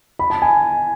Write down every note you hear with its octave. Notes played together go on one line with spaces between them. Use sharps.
B5
A5
G#5